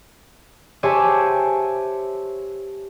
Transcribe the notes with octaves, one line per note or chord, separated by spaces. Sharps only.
G4 C5 C#5 E5 G#5 A5